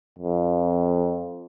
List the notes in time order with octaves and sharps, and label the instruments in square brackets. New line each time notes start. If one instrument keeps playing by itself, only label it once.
[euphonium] F2